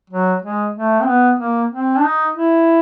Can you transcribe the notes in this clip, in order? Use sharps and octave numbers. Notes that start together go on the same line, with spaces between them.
F#3
G#3
A3
C4
B3
A#3
C4
D4
D#4
E4